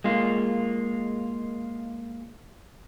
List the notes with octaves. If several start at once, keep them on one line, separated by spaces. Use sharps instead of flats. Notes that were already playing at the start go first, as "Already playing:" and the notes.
G#3 A#3 F4